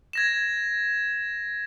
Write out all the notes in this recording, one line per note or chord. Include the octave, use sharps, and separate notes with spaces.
G#6 A#6 E7